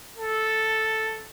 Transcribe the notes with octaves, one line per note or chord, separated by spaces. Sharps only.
A4